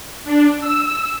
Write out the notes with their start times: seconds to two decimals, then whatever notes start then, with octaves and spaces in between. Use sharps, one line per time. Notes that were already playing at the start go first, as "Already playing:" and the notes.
0.24 D4
0.60 E6